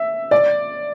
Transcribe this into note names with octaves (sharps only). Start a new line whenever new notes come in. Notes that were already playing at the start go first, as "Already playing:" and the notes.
Already playing: E5
D5